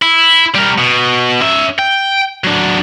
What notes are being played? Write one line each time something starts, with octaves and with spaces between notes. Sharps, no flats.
E4
G3 A#4
B2
C#4 E5
G5
F#3 D4